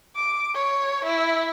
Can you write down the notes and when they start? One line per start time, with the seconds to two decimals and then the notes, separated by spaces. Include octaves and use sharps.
0.16 D6
0.55 C#5
1.05 E4